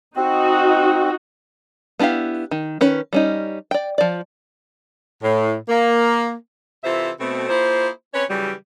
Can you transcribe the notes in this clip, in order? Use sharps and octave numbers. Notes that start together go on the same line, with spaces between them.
C4 D#4 F#4
B3 D4 E4 G4 F5
D#3
D#3 C#4 B4
G3 C#4 D#4
D5 G5
F3 D5
A2
A#3
C3 E3 F4 A4 C5 E5
B2 A3 C4
A#3 E4 F4 G#4 C5
C4 C#4 B4 C#5
C#3 E3 F#3 G3